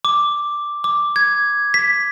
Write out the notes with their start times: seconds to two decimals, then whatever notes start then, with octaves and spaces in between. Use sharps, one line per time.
0.05 D6
0.84 D6
1.16 G#6
1.74 B6